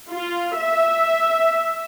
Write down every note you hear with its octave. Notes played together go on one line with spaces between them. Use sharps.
F4
E5